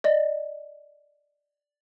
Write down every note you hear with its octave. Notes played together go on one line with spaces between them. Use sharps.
D5 D#5